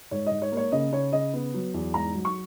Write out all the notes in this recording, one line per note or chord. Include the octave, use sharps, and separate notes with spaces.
G#2 C#5
G#2 D#5
C#5
A#3
C#5
C#3 D#5
C#3 C#5
C#3 D#5
B3
F#3
E2
G#2 A#5
F#3
C#6